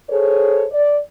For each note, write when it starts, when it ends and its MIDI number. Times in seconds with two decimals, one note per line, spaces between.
0.10 0.66 68
0.10 0.66 69
0.10 0.66 72
0.10 0.66 73
0.72 0.99 74